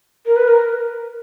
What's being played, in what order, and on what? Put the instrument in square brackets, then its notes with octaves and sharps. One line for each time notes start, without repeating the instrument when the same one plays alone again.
[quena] A#4
B4
A#4